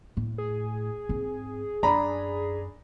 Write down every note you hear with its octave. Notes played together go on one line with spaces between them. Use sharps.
A2
G#4
G#2 C4
F#2 D4 A#5 B5